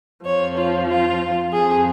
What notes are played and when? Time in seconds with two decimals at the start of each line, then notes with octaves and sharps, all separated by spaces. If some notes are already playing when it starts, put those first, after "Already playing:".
0.25 F2 F3 C#5
0.57 F4
0.89 F4
1.52 F2 F3 G#4